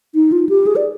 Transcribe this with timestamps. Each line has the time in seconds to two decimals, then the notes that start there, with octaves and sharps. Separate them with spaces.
0.15 D#4
0.32 F4
0.49 G4
0.67 G#4
0.76 D5